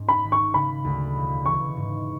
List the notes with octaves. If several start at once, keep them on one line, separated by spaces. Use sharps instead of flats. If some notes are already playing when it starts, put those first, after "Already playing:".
Already playing: G#2 C#4
B5
G#1
C#6
C#3 B5
D2
E1
E3 C#6
G#2